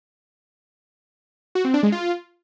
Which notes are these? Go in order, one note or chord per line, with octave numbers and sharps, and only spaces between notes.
F#4
C4
D4
G#3
F4